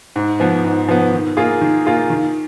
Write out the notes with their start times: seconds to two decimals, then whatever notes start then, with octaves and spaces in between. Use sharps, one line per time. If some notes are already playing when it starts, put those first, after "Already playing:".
0.16 G#2
0.40 F3 B3
0.64 G#2
0.88 F3 B3
1.13 D#3
1.37 A#3 F4 G#4
1.61 D#3
1.86 A#3 F4 G#4
2.10 D#3